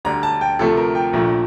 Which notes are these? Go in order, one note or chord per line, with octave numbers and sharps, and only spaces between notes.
D2 D3 G3 A#5
A5
G5
D2 C3 F3 A3 A4
A#4
G5
A#1 A#2 F3 A3